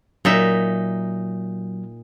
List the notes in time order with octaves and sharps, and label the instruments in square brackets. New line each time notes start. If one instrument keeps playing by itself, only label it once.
[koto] A#2 D#4 E5 [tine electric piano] F#3